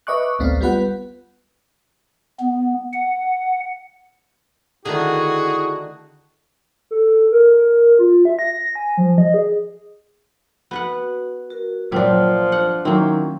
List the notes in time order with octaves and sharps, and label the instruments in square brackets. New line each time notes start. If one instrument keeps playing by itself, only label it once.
[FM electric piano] B4 D#5 E5 C#6 D6 F#6
A1 D2 A3 B3 C4 F5
G3 B3 F4 B4 F#5
[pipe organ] B3
F#5
[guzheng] D3 D#3 A3 [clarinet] E4 [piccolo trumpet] F#4 [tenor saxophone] G#4
[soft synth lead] A4
A#4
F4
E5
A#6
G#5
F3
D#5
G#4
[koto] B3 B4 F#5 [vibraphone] F#4
[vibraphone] F#4 A#4
[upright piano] A#2 [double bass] F3 [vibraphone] F#3 F4 C#5 [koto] C4 D4
[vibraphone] D4 [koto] F#5
[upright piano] D#3 F#3 E4 [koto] A#3 C4 [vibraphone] C#4